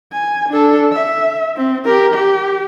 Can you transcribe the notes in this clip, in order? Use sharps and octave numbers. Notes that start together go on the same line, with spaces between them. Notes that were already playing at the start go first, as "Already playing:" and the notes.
G#5
D4 A4
E5
C4
G4 A#4
G4